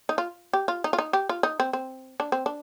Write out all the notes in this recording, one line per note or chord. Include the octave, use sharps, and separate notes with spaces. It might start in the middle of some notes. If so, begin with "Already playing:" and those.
D#4
F4
G4
F4
D#4
F4
D#4
G4
F4
D#4
C4
C4
D4
C4
D4